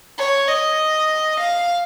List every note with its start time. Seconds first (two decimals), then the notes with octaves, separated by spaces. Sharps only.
0.18 C#5
0.49 D#5
1.40 F5